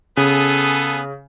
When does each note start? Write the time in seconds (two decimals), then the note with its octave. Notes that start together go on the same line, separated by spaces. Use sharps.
0.17 C#3 B3 G#4 A4